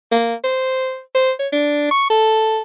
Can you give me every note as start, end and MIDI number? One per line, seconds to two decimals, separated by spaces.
0.12 0.35 58
0.44 1.00 72
1.15 1.32 72
1.39 1.48 73
1.52 1.90 62
1.91 2.10 85
2.10 2.61 69